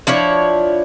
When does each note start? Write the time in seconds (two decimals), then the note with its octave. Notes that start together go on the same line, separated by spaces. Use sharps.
0.07 F3 D4 E4 C#5